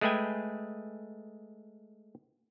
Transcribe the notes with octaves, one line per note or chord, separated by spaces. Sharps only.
G#3 A3 G#4 B4 G5 G#5